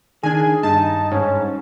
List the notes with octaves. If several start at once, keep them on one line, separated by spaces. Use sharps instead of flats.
D#3 D4 G#4 G#5
G2 D#4 A5
G#2 C#4